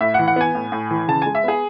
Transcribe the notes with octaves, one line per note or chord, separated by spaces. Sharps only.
A2 E5
F#5
E3
F#5
B3 G#5
A2
A2
E3
C#3 A5
G#3 G#5
E5
B3 G#4